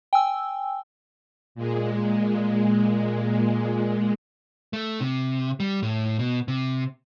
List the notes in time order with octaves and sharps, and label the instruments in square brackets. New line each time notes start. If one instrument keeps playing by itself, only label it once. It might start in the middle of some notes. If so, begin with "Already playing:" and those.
[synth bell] G5 G#5 E6
[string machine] A#2 G#3
[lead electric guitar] A3
C3
G3
A2
B2
C3